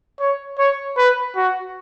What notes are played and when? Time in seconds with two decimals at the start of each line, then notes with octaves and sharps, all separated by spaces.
0.20 C#5
0.58 C#5
0.97 B4
1.36 F#4